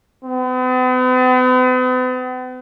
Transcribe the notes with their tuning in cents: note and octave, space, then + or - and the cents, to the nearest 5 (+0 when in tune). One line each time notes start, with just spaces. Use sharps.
B3 +45